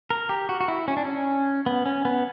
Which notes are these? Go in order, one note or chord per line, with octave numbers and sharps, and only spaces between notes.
A#4
G4
F#4
F#4
E4
C#4
D4
C#4
B3
C#4
B3